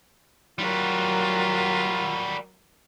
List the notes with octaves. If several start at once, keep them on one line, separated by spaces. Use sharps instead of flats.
F#3 G3 F4 F#4 A#4